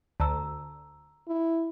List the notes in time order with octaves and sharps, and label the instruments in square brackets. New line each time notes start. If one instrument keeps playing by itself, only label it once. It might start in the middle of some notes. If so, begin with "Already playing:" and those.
[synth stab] D2 [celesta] A5 A#5 E6
[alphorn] E4